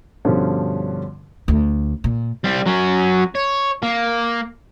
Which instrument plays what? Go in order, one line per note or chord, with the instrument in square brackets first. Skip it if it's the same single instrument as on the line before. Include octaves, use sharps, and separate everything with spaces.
[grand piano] G2 B2 D3 F3 C#4
[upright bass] D2
A#2
[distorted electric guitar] G3 C4
F#3 C#4
C#5
A#3